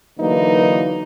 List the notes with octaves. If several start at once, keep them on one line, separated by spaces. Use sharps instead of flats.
D3 E3 F#3 A#3 D#4 B4